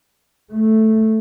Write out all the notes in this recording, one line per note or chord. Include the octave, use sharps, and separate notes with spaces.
A3